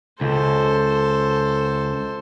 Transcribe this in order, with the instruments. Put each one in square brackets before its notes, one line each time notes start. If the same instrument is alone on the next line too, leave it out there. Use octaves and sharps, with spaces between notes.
[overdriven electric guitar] C#2 [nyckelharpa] A4 C5